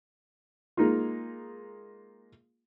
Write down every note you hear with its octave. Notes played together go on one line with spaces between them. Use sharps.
G#3 A#3 D#4 F4